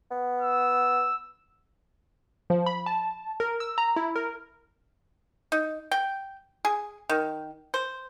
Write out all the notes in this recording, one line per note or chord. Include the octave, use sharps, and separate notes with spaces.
B3
E6
F3
B5
A5
A#4
E6
A#5
E4
A#4
D#4
G5
G#4
D#3
C5